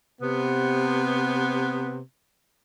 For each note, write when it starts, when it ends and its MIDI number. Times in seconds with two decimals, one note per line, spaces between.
0.22 1.99 48
0.22 1.99 59